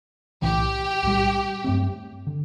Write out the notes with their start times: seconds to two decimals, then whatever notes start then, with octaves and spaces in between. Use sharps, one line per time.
0.42 B1 A2 E3 G4
1.03 B1 A2 G3
1.64 G2 F#3 A3 C4
2.27 D3